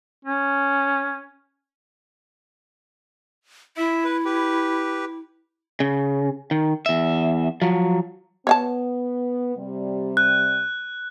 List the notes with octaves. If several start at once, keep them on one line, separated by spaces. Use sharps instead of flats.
C#4
E4 E5
B4
G4 B4
C#3
D#3
E2 E5
F3 F#3
B3 C#5 F5 A5
C3 G3
F#6